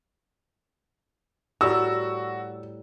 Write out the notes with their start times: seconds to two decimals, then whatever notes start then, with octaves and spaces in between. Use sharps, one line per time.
1.61 A2 G3 F#4 A#4 E6